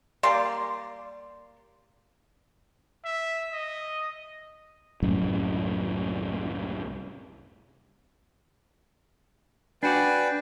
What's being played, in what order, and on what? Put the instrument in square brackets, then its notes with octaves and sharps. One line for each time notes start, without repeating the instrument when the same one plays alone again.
[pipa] G3 A#3 D5 C6
[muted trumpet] E5
D#5
[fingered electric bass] C2 F#2 A2
[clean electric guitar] D4 F#4 D5 [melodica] B4 G5 G#5